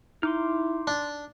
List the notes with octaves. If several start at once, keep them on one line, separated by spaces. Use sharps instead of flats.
D#4 E4 C6 D6 F6
D4